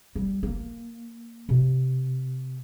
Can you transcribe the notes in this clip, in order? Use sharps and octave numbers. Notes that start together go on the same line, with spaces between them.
G3
A#3
C3